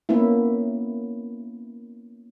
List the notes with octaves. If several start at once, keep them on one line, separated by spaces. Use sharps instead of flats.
A#3 B3 C#4 E4